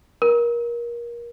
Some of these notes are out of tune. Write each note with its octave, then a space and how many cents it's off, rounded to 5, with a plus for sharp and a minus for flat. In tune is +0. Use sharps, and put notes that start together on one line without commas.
A#4 +25